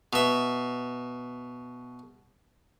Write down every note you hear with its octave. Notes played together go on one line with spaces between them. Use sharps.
B2 E5